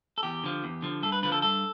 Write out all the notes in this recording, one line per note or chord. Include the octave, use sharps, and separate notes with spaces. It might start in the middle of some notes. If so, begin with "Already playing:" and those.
A4
E2 G4
D3 F3
E2
D3 F3
G2 A4
B4
D3 F3 B4
A4
G2 A4